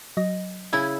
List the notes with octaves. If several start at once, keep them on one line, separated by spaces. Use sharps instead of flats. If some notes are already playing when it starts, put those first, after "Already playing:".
F#3 D#5 A#6
C#3 E4 G#5